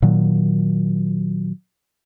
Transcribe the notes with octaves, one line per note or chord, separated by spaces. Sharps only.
A#2 D#3 F#3